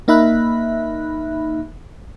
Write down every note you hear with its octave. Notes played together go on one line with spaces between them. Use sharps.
A#3 D#4 E5 B5 F#6